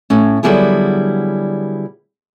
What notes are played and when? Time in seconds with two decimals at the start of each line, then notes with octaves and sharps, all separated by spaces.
0.10 A2 C#4
0.43 D3 F#3 G3 B3 E4 G#4